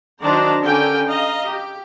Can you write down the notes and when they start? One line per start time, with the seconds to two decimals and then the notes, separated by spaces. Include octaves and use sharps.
0.21 D#3 F#3 D4 C5 D5 A#5
0.63 D3 C#4 G4 A#4 G5 G#5
1.08 D#5 F5 A#5
1.47 G4